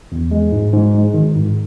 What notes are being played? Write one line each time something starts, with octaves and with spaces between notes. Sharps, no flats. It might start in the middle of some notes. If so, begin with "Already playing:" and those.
E2
G#3
G#2
G#2
G#3
D#3
G#2